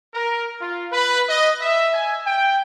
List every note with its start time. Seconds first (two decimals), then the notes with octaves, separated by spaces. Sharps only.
0.14 A#4
0.61 F4
0.92 B4
1.29 D#5
1.61 E5
1.94 G#5
2.26 G5